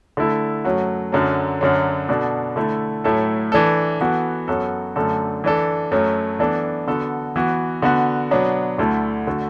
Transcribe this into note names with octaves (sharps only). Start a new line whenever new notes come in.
D3 A3 E4 A4
F#2 F#3 A3 F#4
F#2 D3 F#3
F#2 D3 F#3
B2 B3 D4 A4
D3 A3 E4 A4
A2 F#3 A3 E4 A4
E3 D4 A4
E3 B3 F#4 A4
F#2 F#3 B3 F#4 A4
F#2 D3 A3 D4 A4
E3 D4 A4
F#2 F#3 A3
E3 B3 D4 A4
D3 B3 F#4 A4
E3 B3 F#4
D3 B3 F#4
B2 F#3 B3 D4
D2 D3 A3 E4 A4
D3 A3 F#4 A4